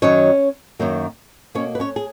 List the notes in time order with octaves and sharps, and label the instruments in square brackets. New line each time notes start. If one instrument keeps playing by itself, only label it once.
[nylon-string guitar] F#2 D#3 F#3 C#4 C#5
F#2 D#3 F#3 A#3
B2 A#3 C#4 C#5
B4
C#4 C#5
G#4